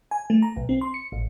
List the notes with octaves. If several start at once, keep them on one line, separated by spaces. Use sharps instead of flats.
G#5
A3
A#5
B1
C4
C6
C#7
A1